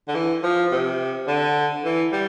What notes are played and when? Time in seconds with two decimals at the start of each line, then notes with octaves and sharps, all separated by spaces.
0.08 D3
0.15 E3
0.43 F3
0.71 C3
1.28 D3
1.85 E3
2.12 G3